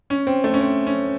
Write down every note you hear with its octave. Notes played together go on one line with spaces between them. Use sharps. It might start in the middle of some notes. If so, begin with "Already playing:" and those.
C#4
C4
A3
C#4
C4
C#4